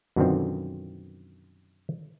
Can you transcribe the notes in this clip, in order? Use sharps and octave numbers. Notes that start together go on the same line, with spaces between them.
F#2 B2 D3 D#3 F3 C4